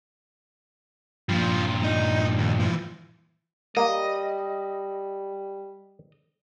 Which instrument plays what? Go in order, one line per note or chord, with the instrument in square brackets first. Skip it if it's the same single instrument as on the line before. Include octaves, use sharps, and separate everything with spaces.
[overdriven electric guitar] G2 A#2 [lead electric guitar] F3
[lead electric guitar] D#4
D#2
E3 F3
[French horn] G3 [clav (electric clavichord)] A#3 [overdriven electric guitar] D#5